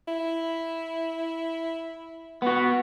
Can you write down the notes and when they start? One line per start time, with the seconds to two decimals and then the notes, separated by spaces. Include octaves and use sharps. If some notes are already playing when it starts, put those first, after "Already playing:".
0.08 E4
2.42 B3 F#4